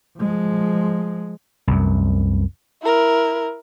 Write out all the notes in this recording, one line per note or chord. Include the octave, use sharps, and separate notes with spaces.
F3 G#3
C2 F#2
E4 A#4